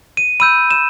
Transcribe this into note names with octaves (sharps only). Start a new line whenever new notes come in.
D#7
B5 E6 G6 D#7
E7